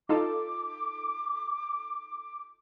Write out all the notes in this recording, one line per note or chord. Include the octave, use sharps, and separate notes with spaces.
D#4 F4 A4 D6